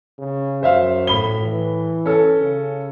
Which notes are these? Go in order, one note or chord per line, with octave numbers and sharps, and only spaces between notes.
C#3
F#2 C5 E5 F5
A2 B5 G7
E3
C#4 A4
C#3